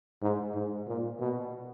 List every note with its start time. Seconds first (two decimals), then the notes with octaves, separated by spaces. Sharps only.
0.22 G#2
0.55 G#2
0.87 A#2
1.20 B2